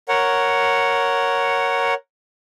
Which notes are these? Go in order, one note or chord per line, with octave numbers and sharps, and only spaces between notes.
A#4 C#5 F#5